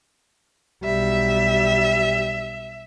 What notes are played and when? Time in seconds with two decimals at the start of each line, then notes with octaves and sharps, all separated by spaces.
0.84 B1 G3 E5